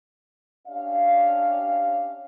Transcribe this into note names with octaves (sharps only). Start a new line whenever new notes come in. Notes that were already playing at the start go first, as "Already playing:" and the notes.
C#4 D4 G4 D5 E5 F5